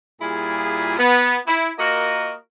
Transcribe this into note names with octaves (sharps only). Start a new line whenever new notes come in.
A#2 G3 E4 F4 G#4
B3
E4
A#3 F4 F#4 A#4 D#5